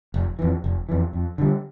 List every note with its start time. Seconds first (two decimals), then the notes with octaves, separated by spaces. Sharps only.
0.14 F1
0.39 F2 E3
0.64 F1
0.89 F2 E3
1.13 F2
1.38 D3 G3